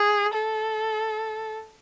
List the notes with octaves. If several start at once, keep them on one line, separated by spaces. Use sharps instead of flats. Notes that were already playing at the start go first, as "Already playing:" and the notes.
Already playing: G#4
A4